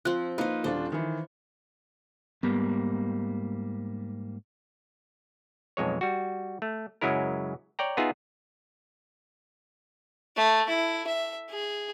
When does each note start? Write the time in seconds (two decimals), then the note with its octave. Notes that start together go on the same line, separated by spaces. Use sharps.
0.05 F3 C4 F#6
0.38 A#3 D#4 B4 C5 F5
0.64 D#1 D4 F4 C5
0.92 D#3 E3
2.43 G#2 G3 A#3 B3
5.77 B1 F2 G#3 C#5
6.01 G3 F#4
6.62 A3
7.01 F#2 C#3 F#3 G#3 E4 A#4
7.79 C#5 D5 G5 A#5
7.97 B3 D#4 F4 G#4 E5
10.37 A3
10.69 E4
11.07 E5
11.50 G#4